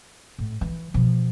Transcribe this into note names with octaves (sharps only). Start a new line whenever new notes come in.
A2
E3
B2 F3